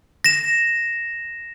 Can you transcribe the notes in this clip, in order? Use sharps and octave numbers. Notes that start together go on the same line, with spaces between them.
A#6 E7